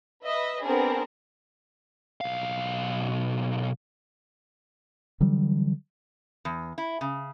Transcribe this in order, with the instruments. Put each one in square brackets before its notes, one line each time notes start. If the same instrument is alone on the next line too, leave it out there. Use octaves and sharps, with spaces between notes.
[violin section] B4 D#5 E5
B3 C4 D4 G#4 A#4
[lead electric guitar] B1 F5
[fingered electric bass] D3 E3 F#3 G3
[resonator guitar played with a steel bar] E2
E4
C#3